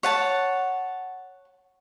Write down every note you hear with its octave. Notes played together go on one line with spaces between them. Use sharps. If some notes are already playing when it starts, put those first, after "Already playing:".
C#5 F#5 A5